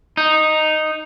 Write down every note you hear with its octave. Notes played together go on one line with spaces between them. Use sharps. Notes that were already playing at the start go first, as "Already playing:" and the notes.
D#4